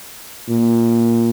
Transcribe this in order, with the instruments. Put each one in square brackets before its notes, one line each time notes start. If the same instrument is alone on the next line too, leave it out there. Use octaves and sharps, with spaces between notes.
[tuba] A#2